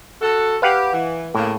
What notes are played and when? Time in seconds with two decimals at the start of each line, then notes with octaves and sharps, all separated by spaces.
0.21 F#4 A4
0.62 G4 B4 F5 F#5
0.92 E3
1.35 A2 C#3 A#3